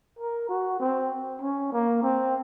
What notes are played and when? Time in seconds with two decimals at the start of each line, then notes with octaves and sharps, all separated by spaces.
0.19 A#4
0.49 F#4
0.80 C4
1.41 C#4
1.72 A#3
2.03 C4